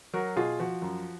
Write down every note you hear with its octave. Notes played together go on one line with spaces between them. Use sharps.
F#3 F#4 A#4
B2 F4 G#4
F3 F#4
F#2